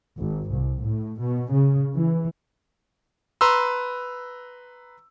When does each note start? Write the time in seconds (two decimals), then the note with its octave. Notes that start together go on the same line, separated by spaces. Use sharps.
0.18 G#1
0.51 C2
0.83 A2
1.19 B2
1.51 C#3
1.94 E3
3.41 B4 A#5 C6 E6